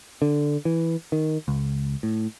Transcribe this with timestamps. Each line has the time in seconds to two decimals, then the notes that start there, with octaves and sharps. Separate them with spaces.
0.22 D3
0.65 E3
1.12 D#3
1.48 C#2
2.03 A2